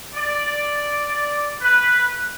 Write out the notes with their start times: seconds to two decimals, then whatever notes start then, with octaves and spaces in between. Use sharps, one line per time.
0.15 D5
1.61 B4